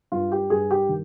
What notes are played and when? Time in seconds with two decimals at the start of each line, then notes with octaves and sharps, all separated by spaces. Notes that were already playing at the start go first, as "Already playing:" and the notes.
0.12 G2 F4
0.32 G4
0.50 G2 G#4
0.71 G4
0.89 D#3